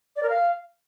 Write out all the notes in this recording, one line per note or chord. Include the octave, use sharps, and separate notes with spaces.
D5
A#4
F5